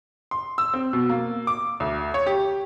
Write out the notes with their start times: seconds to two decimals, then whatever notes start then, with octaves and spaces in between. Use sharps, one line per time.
0.31 C6
0.58 E6
0.74 C4
0.93 B2
1.10 A#3
1.47 D6
1.80 D2
2.14 C#5
2.26 G4